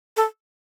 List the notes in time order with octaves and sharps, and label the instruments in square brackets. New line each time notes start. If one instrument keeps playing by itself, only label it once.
[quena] A4